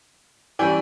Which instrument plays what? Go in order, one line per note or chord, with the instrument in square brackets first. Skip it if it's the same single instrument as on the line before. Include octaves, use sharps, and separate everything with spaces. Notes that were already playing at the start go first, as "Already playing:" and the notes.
[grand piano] E3 G3 C#4 [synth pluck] D5 G5 G#5